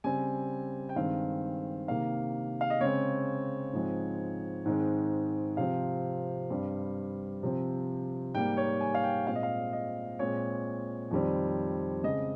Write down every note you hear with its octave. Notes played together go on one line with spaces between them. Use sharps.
C#3 G3 C4 G#5
G5
G2 D#3 G#3 C4 F5
C3 D#3 A#3 F5
F5
D#5
C#3 G#3 C4 C#5
G#2 F3 G#3 C4
G#2 D#3 G#3 C4
C3 F3 C4 F5
G2 G3 C4
C3 F3 C4
G#2 G3 A#3 G5
C#5
G#5
F5
G5
A#2 G#3 C4 F5
D#5
F5
D#5
A#2 G#3 C4 C#5
F2 D#3 G3 C4
C#3 G#3 C4 D#5